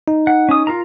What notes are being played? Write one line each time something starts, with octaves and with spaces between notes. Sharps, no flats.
D#4
F#5
C#4 D#6
F4 A#4 A#5